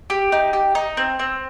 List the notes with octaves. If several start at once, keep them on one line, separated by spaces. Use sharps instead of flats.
G4
D#4
G4
D#4
C4
C4